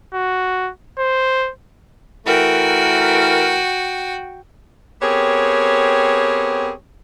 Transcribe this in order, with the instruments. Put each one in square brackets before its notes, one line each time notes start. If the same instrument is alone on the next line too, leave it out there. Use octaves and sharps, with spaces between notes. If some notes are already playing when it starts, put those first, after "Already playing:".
[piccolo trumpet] F#4
C5
[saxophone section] E3 A3 A#4 [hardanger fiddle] F#4 G5
[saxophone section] B3 C4 G4 G#4 A#4 C#5